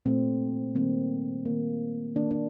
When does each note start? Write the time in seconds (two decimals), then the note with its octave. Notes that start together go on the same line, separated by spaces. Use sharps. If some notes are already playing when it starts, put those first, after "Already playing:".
0.05 A#2 A3 C4
0.75 D#3 G3 A#3 C4
1.45 D#3 A#3
2.15 D#3 A#3 D4
2.31 D4